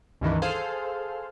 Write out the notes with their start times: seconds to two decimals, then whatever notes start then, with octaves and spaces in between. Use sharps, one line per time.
0.21 C#2 G2 D#3 E3
0.42 G#4 A4 C5 F5